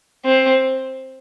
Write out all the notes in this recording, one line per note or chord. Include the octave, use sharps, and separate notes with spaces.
C4